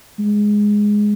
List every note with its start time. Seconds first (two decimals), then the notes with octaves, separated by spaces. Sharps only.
0.19 G#3